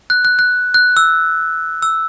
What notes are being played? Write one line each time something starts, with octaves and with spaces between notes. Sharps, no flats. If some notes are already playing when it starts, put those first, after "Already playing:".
F#6
F#6
F#6
F#6
E6
E6